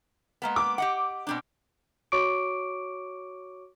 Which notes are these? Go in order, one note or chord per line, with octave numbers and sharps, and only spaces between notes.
G#3 A#3 B3
D6
G4 D#5 F#5
B2 C4 D4
F#4 C#5 C#6 D6 D7